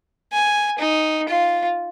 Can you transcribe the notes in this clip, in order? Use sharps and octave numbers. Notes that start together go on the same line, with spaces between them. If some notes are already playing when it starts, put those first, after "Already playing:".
G#5
D#4
F4